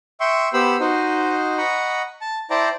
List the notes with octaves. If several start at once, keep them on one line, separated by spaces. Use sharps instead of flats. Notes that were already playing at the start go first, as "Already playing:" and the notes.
E5 G5 C6 C#6
B3 G4 C5 B5 E6
D#4 F#4 C5 D#5
D#5 F#5 A#5 B5 C#6
A5
E4 C5 D5 G5 A5 A#5